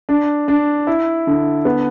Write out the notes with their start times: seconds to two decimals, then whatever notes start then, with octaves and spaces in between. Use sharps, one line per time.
0.09 D4
0.48 D4
0.87 E4
1.27 D3
1.65 B3